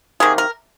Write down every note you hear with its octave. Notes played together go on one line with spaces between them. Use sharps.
C3 D#3 A#3 G#4
A#4